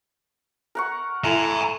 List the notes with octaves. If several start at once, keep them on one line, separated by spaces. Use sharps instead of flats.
A#4 F#5 C#6
E4 A4 G#5 A#5